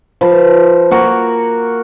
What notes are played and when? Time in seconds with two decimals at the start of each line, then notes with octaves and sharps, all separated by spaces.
0.21 F3 B4 A5
0.91 A#3 F#4 A#4